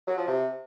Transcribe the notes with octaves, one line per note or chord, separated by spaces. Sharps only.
F#3
F3
C3